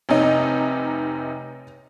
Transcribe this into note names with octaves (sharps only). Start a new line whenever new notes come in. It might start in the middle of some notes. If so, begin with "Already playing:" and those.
F1 C3 D#4 C#5 D#5